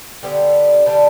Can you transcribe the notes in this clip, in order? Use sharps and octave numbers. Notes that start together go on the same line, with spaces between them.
D3 G3 B3 D4
D3 G3 B3 D4